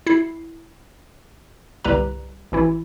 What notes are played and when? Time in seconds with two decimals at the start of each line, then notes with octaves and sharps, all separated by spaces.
0.07 E4 C7
1.85 G1 C2 G3 G4 B4 A#5
2.52 A1 E3 E4